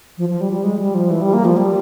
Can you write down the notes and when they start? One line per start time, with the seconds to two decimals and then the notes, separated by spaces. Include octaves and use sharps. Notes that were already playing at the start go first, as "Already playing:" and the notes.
0.18 F3
0.29 F3
0.41 G3
0.52 G3
0.64 G#3
0.79 G3
0.95 F3
1.10 E3
1.21 G3
1.34 A#3
1.45 F3
1.57 G3